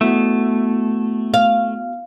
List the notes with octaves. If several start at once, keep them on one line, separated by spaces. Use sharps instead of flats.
A3 B3 E4 F#4
F5